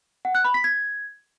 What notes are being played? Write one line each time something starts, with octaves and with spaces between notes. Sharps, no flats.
F#5
F#6
B5
B6
G#6